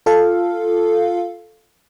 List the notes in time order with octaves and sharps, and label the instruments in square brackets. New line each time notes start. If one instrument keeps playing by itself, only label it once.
[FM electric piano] F4 A4 F5